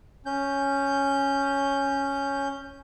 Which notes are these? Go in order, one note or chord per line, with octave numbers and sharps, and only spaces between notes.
C#4 G6